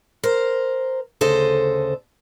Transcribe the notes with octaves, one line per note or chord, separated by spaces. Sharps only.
A#4 C5
D2 C#3 A4 C5 D#5